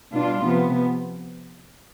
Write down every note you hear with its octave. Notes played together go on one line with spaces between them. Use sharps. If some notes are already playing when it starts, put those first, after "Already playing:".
B2 G3 D4 F4
C3 F3 B3